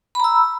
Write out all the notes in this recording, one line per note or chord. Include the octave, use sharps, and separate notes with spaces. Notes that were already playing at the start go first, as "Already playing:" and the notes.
A#5 B5 E6